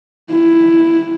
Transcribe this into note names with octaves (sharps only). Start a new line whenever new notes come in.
E4